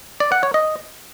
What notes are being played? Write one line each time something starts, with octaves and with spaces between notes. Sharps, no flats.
D5
F#5
C#5
D#5